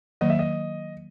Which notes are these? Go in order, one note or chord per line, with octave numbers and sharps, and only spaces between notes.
D#3 F#3 A#3 D#5
E5
D#5